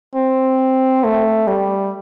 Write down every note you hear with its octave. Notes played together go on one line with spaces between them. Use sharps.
C4
A3
G3